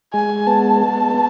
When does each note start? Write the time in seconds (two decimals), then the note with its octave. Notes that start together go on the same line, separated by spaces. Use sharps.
0.14 G#3 G#5
0.47 B3 A5
0.80 B3
1.14 B3